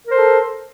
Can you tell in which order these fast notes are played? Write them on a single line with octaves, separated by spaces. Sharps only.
A#4 C5 A4